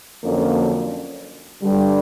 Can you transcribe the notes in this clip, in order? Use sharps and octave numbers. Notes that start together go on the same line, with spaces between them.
F2 D3 F#3 A#3 C#4
G2 D3 G3